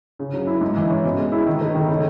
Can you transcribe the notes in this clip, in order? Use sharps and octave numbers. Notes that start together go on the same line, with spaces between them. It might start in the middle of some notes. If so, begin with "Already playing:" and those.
C#3
F#3
E4
G#2
E3
C#4
B2
G#3
E4
D#3
A3
D#3
C#3